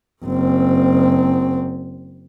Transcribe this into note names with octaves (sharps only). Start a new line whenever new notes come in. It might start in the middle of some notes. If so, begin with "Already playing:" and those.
F#1 C4